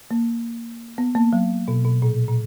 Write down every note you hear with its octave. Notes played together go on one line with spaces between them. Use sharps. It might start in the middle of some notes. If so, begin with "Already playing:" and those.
A#3
B3
A#3
F#3
B2
B2
A#2
A#2